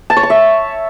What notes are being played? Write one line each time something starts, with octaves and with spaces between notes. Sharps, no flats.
A5
C#5
C#6
E5